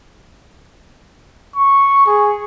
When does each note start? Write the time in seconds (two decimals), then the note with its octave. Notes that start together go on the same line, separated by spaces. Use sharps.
1.56 C#6
2.06 G#4